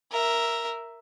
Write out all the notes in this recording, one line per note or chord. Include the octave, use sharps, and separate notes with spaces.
A#4 E5